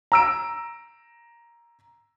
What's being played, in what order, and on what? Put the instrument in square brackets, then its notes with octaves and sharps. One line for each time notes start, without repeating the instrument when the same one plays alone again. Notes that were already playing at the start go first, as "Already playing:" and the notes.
[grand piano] A#5 E6 D7